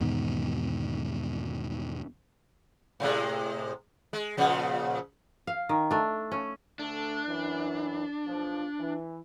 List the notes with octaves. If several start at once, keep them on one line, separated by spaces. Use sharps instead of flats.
E2 G#2 B2 D#3
A2 C3 G#3
G#3
A#2 C#3 F3
F5
D#3
A3 D4
C#4
D2 A3 D4 A4
F#2 E3
B1 F3
E3